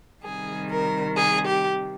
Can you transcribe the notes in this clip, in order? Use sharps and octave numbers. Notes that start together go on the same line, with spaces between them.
C3 D#3 G3 G#4
A#4
G#4
G4